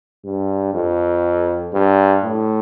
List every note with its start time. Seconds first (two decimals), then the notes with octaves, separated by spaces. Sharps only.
0.24 G2
0.74 F2
1.73 G2
2.23 A2